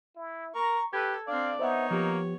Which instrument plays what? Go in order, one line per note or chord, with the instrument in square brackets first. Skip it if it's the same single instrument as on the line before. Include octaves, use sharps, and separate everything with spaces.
[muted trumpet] E4
[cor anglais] A#4 [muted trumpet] A#5 [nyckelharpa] C#6
[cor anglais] G4 [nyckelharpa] A4 [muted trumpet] B4 [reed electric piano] G#6
[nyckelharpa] C4 D4 [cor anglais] D5 [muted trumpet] F5
[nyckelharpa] B3 C#5 [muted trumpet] D#4 [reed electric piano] C5 E5 F#5
[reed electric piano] F3 G4 [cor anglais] A#3